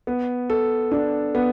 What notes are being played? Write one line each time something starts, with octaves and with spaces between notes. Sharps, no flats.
B3
A4
D4
B3